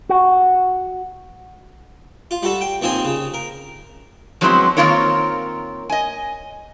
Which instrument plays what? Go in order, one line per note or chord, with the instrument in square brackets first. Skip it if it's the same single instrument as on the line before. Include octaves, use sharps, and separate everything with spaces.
[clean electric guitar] F#4
[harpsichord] F4
G3 F#4 A4
G5
D#2 F3 C4 G#5 C6
C#3
A#4
[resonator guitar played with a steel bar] F3 F#3 G#3 B3 C4 E4
D#3 A#3 C4 F4 A#4 C#5
D#5 G#5